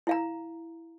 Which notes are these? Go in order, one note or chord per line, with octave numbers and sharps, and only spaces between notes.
E4 F5 A#5